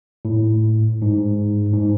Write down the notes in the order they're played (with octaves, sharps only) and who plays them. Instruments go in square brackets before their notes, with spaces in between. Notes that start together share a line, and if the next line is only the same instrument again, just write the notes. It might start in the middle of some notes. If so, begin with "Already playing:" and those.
[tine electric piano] A2
G#2
G#2